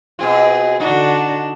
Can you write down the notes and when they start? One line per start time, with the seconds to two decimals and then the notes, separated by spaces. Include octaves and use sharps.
0.19 B2 C4 F4 G#4
0.80 D3 D4 D#4 F#4